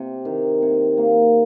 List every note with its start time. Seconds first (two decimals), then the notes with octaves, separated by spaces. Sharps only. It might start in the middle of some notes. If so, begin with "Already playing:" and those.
Already playing: C3
0.25 D#3
0.62 C3
0.98 A#3